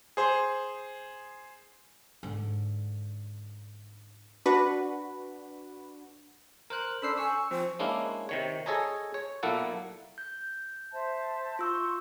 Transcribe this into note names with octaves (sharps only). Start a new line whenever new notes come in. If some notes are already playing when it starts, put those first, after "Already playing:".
G#4 C5
G#2 D3
D4 F#4 B4
A#4 C5 F#6
C#4 D4 A4 C5 B5 E6 C7
G#5 C#6 E6
F3 C4 C5
G#3 A#3 C#4 D4 E4
C3 D#3 C#5
G#4 A4 C#5 D#5 G#5 A#5
C#5
B1 A#2 A#3 E4 A4 F#5
G6
C5 E5 A5
F4 C6 C#6 E6 G6